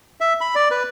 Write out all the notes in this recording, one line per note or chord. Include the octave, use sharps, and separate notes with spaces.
E5
B5
D5
B4